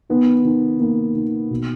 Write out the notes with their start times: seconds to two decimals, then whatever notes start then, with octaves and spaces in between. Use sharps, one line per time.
0.09 D#3 B3
0.45 D#3
0.80 D#3 A#3
1.15 D#3
1.50 B2